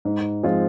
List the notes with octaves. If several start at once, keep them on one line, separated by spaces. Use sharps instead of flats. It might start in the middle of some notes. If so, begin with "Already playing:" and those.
G#2
F3 G#3 C4 F4